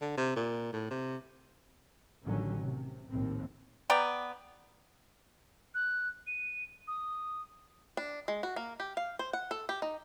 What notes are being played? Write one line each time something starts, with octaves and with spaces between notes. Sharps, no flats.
D3
C3
A#2
A2
C3
A1 D3 D#3 F#3 C#4
C3
A#1 D#2 A2 C4
B3 D5 G5 A#5
F#6
D#7
D#6
D4
G#3
F#4
A#3
G4
F5
C5
F#5
A4
G4
D#4